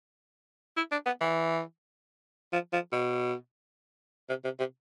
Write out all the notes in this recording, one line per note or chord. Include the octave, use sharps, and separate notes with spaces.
E4
D4
B3
E3
F3
F3
B2
C3
C3
C3